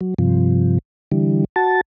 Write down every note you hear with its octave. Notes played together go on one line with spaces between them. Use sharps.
F#3
G2 C3 F3
D3 E3 G3
F#4 A5